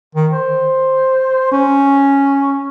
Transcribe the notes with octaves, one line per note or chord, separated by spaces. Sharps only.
D#3
C5
C#4